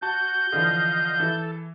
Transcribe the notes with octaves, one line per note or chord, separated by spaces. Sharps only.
F#4 A5 G6
D3 E3 F3 D#5 F5
E3 E4 A4